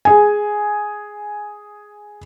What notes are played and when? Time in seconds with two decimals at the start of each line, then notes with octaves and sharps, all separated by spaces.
0.05 G#4 G#5